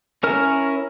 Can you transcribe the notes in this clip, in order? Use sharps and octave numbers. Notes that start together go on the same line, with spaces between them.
C#4 E4 A#4 F6